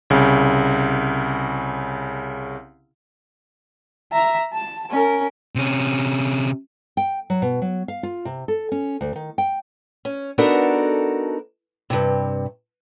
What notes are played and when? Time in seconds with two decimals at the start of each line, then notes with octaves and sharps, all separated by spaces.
0.10 C2 C#3
4.12 E5 A#5
4.53 A5
4.90 C#4 A#4
5.55 C3 C#4
6.97 G5
7.30 F#3
7.42 B2
7.62 F#3
7.88 F5
8.03 F4
8.25 C3
8.48 A4
8.72 C#4
9.01 D2
9.16 D#3
9.38 G5
10.05 C#4
10.38 B3 D4 D#4 F#4 A4 A#4
11.90 G2 C3